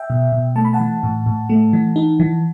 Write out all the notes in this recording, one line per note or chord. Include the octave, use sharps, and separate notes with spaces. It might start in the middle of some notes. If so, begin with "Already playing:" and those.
Already playing: E5 G5
B2
B2
A3 A5
B5
F#5 A5
E3
A2
A2
A3
E3
D#4
E3